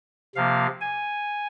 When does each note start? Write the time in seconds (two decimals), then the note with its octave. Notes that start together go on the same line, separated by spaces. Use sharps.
0.35 C3 F3 A#3 F5
0.80 G#5